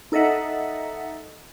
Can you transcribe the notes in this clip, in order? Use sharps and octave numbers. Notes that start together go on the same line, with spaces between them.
D#4 A4 D#5 E5 F#5